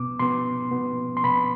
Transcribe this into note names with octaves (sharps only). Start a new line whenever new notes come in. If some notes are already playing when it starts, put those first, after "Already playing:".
Already playing: B2 B3 D6
B2 B3 C6
B2 B3
C6
B2 B3 B5